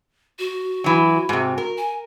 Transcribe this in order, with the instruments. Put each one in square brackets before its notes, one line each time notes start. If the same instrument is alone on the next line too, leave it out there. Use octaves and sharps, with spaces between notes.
[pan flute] F#4
[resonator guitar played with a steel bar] E3 F#3
G#2 C3
A#4
[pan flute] G#5